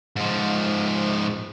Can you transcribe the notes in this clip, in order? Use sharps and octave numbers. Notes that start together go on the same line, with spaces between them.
G#2 F3